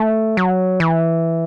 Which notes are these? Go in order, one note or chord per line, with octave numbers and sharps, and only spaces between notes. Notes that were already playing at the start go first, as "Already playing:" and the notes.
Already playing: A3
F#3
E3